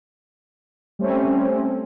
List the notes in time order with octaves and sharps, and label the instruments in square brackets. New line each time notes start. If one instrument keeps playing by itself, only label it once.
[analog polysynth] G3 A3 C4 C#4